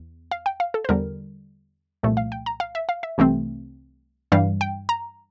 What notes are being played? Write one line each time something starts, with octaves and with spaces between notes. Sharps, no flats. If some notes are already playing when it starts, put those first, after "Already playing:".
Already playing: E2
F5
G5
F5
A4
C5
E2 D3 G3 A#4
C2 A#2 F3 A3
F5
G5
A#5
F5
E5
F5
E5
C2 C3 E3 A3 C4
G2 E3 G3 F5
G5
A#5